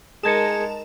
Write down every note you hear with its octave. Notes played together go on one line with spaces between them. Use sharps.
G#3 D#4 G#4 A#4 A5 G#6 C#7 E7